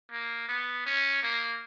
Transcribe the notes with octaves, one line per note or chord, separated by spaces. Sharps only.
A#3
B3
C#4
A#3